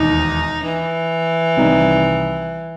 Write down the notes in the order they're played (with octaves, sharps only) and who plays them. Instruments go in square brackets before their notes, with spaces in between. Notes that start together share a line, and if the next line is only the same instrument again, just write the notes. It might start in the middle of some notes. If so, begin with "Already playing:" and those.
Already playing: [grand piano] E1 D#2 D#3 [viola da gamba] D#4
[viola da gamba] E3
[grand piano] C2 C3 D#3 G3 D#4